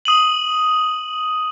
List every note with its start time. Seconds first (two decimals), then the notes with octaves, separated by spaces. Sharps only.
0.05 D#6 D#7 F#7